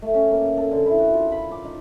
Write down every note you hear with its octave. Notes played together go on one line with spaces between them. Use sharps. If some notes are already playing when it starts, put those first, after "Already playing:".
A3
C#4
A#3
A4
D3
E4
F#4
F4
B5
D6
D#4